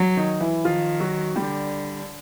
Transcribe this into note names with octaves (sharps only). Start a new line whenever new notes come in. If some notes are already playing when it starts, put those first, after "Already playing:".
Already playing: F#3
D#3 D#4
E3 E4
D#3 F3 F4
F#3 F#4
D3 G3 G4